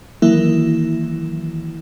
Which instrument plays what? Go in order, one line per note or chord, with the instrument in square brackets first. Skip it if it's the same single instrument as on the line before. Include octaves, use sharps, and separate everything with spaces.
[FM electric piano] D#3 E3 F#3 A#3 E4